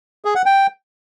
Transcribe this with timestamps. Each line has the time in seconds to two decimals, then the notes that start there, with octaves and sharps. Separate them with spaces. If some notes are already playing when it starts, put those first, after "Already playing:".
0.25 G#4
0.35 F#5
0.46 G5